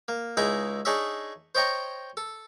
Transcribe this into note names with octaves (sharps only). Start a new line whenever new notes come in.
A#3
C#2 D#4 E4 G#4 A#5 D#6
D4 D#4 G#4 C#5 D#5 E5
C5 C#5 D#5 G5 A#5 C#6
A4